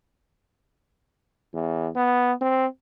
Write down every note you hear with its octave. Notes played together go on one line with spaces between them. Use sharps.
E2
B3
C4